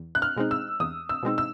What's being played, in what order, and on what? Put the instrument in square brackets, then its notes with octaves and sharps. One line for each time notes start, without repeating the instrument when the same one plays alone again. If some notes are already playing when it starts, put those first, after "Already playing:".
Already playing: [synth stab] E2
[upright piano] F#6
F6
[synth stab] B2 G#3 C4 D#4
[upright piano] E6
[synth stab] E2 [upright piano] D#6
[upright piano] E6
[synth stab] B2 G#3 C4 D#4
[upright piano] E6